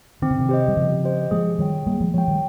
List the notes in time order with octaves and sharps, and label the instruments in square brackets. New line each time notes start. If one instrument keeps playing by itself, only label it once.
[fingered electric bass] D#3 [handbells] C4
[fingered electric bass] C#3
C3 D#3
[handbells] G4 C5 D#5
[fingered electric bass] G3
[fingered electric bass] C#3 F3 [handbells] C4
[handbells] G4 C5 D#5
[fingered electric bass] F3 G#3 [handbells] G#4
[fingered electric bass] D#3 G3 [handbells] C#5 G5
[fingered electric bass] G3 A#3 [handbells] G#4
[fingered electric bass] F3 G#3
[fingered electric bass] F3 G#3 [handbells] C#5 G5
[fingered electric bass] D#3 G3